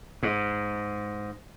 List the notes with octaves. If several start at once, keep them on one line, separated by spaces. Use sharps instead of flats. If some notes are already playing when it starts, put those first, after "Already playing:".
G#2